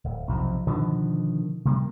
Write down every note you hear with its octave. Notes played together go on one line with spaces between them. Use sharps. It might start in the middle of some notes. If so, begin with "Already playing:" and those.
D1
B1 F2 C3
B2 D3 D#3 F3
C3 G3 A#3